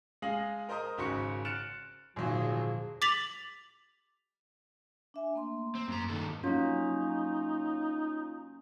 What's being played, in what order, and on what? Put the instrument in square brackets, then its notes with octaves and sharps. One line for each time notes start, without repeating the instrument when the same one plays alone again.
[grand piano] G#3 G#4 F5 A#6 F#7
A#4 C5 D#5 A#5 D#6
G#1 C#3 F#4 C5 C#6 C#7
F6 F#6 A6 C#7 D7 E7
[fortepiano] G#1 F#3 [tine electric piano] E2 A#2 D3 [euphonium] F3 [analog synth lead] G#4
[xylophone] D6 A6 B6 F7 F#7
[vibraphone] D4 E5 G#5
A3 A#3 C6
[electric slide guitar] C4
F#2 A#5
G2 D#3 A4
[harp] F#3 A#3 [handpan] C#4 [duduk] D#4 [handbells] F4